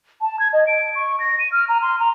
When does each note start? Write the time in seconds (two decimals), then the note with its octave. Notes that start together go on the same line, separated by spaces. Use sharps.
0.21 A5
0.39 G#6
0.53 D#5
0.67 D7
0.95 C#6
1.20 A#6
1.39 D#7
1.52 F6
1.69 A#5
1.82 C6
1.99 A#5